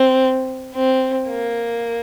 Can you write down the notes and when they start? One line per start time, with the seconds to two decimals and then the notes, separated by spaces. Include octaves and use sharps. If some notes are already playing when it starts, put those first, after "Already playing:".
Already playing: C4
0.74 C4
1.28 A#3